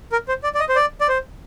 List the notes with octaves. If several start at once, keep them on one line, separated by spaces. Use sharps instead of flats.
A#4
C5
D5
D5
D#5
C5
D5
D5
C5